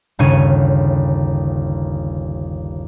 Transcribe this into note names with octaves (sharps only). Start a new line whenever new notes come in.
G1 D#2 C#3 C#5 G#6 D#7